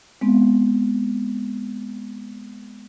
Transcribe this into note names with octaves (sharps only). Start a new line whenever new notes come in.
G#3 B3 C4